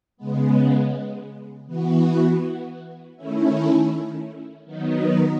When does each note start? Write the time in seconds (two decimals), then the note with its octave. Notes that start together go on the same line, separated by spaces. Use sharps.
0.17 C#3 G#3 B3
1.66 E3 B3 F#4
3.16 D#3 A3 C#4 E4
4.66 D#3 F#3 B3 D#4